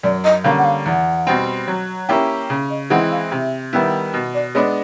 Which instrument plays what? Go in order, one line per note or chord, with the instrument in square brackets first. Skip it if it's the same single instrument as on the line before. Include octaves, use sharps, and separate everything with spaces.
[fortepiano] F#2 [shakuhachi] D5
[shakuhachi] D#5
[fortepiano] D3 G3 A#3 C#4 [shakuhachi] F5
[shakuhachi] F#5
F5
[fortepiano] E2 [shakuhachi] F#5
[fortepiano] B2 G3 C4
F#3
A#3 C#4 E4 G4
C#3
[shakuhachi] D#5
[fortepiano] E3 G#3 C4 [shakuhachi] F#5
[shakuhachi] F5
[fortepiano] C3 [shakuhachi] E5
[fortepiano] D#3 G3 B3 E4
B2
[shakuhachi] D5
[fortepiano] G#3 B3 D4 [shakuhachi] C#5